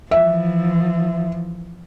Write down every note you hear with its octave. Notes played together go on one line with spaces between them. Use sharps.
E3 F3 E5